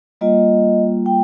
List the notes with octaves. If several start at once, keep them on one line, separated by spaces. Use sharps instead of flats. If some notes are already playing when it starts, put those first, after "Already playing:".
G3 A#3 F4 D#5
G5